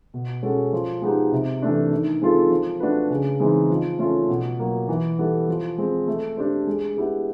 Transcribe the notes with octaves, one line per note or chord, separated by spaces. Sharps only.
B2
G#3 C#4 F#4 A4
F3
G#3 B3 D#4 G4
C3
E3 A3 D4
D#3
G#3 C4 F4 A4
F3
A3 D4 F#4 B4
C#3
E3 G#3 C4 D#4
F3
A3 C#4 F4
B2
F#3 A#3
E3
G3 B3 E4 A4
F3
G#3 C4
A3
D4 G4 C5
G#3
B3 E4 G4